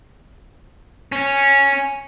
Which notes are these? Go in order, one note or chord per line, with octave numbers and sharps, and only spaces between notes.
C#4